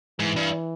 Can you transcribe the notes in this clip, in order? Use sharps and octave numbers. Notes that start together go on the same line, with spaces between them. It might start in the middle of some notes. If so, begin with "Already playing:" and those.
G#2 E3
G2